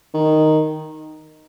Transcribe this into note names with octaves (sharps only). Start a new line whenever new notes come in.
D#3